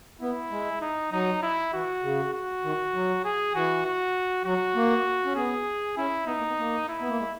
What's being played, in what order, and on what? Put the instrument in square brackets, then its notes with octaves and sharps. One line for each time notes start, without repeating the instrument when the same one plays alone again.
[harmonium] B3 [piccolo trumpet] E4
[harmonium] G#3
[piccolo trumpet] D#4
[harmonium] F#3 [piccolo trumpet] D#4
[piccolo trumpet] E4
[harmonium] E3 [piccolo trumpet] F#4
[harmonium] C#3
[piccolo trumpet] F#4
[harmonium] D#3
F#3
[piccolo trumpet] G#4
[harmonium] E3 [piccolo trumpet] F#4
[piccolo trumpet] F#4
[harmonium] F#3 [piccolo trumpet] F#4
[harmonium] A#3
C#4
[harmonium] B3 [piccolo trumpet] G#4
[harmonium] C#4 [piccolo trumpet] E4
[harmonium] B3 [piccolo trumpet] D#4
[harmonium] A#3
B3
A#3
[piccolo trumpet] E4
[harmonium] B3
A#3
G#3